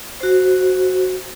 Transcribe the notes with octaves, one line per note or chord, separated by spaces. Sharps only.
F#4 C5